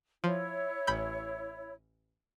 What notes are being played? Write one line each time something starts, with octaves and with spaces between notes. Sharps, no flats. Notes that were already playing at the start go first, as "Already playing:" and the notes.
F3 E4 C#5
A1 B5 G6